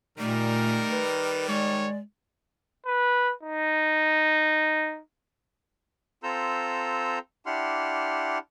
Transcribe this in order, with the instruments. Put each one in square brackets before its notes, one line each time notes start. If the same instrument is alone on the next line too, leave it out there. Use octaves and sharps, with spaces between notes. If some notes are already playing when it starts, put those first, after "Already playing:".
[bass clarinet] A#2 [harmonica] D#3 G3 [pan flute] A3 [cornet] A#4
[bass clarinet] B4
[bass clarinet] G#3 [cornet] C#5 [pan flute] D5
[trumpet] B4
D#4
[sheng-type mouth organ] C4 F4 A4 A#5 E6 G6
D4 E4 G4 F#5 C6 F6